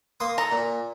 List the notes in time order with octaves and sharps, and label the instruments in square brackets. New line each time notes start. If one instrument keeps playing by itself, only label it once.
[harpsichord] A#3 C6 D#6
[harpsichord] A4 [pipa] A#5
[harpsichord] A#2